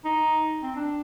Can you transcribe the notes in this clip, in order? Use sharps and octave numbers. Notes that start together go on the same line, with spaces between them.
D#4
C4
D4